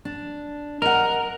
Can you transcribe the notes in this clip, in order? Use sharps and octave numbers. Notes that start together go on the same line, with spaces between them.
D4
A#4 D#5 F#5